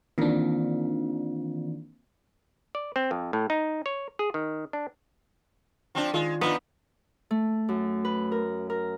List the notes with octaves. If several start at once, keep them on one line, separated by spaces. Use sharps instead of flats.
D#3 E3 A#3 C4 D4 F4
D5
C4
F2
A2
D#4
C#5
G#4
D#3
D4
F3 C4 D4
D#3 G#3 F4
F3 B3 D4 D#4
A3
F#2
B4
A#4
A#4